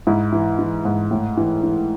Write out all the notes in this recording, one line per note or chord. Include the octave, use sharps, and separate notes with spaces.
G#2 E4
E3
E3
G#2
A2
E3
E3